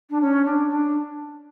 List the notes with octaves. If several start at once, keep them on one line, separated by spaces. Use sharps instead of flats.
D4
C#4
D4
D4